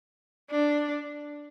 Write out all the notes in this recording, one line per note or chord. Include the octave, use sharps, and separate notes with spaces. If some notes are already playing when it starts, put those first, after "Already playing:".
D4